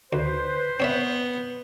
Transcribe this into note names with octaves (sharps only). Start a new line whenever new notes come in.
D2 B4 C5
B3 C4 C#5 E5